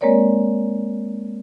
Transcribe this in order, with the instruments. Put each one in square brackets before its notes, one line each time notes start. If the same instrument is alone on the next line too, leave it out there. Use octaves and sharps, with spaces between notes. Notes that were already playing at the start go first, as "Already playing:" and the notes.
[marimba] G#3 A#3 C4 A#4 C#5 D5